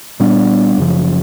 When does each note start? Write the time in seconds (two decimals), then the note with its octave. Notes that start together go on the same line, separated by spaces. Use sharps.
0.20 A#2 G3 B3 D4
0.78 F#2 C#3 F3